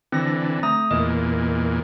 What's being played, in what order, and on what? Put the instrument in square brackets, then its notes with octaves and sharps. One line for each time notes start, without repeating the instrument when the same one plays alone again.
[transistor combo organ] D3 E3 [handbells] C4 A#6
[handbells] A3 A#5 D#6
[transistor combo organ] E2 A#2 [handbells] D#5